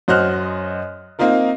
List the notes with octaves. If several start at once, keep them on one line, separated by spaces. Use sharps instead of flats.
F#2 F#4 C5 D#5 F6 F#6
A#3 C4 D#4 F4 A#4